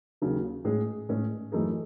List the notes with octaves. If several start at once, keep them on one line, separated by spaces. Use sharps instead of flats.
D#2 C#3 F#3
A2 G#3 C#4 G#4
A2 G#3 C#4 G#4
F#2 E3 A3 D#4 G#4